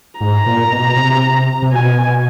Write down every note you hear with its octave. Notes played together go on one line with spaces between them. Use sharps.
G#2 A#5
A#2
B2
C3
C3
B2 G#5